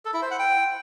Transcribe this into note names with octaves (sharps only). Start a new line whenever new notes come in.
A4
E4
C5
F#5
G5